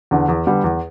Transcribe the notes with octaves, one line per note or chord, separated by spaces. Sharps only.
E2 D3
E2
D3 G3 B3
E2